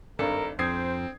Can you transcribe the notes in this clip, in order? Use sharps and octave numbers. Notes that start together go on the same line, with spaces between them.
G#1 G2 D4 A4 A#4
F2 C4 C5 D#6 G#6 C7